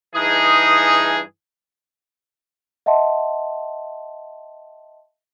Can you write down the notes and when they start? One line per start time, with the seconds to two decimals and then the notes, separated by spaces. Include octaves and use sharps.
0.15 G2 E3 D#4 G#4
2.86 D#5 E5 F#5 A5 C6